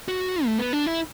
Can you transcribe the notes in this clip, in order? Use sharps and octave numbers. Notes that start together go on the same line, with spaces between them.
F#4
A3
B3
D4
E4